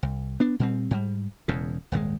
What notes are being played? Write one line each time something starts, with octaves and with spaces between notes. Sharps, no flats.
C2
B3 D4
A#2 G3 C4
G#2 G3
E1 E2 C#3
D#1 G#1 F#3 G#3